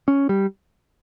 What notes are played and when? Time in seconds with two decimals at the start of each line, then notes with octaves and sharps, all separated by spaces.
0.08 C#4
0.29 G3